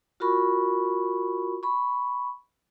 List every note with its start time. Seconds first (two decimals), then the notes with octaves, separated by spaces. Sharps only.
0.20 F4 F#4 A#4 B5 C#6
1.63 B5 C#6